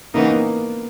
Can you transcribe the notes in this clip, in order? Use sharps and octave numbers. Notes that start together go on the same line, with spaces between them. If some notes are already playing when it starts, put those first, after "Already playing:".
C#3 E3 A#3 B3 D#4
B3